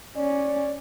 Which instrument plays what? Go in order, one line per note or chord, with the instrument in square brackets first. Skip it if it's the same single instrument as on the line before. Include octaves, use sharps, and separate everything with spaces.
[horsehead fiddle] C#4 [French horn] D5